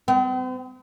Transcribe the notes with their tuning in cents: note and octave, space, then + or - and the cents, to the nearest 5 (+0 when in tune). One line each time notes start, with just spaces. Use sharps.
C4 -45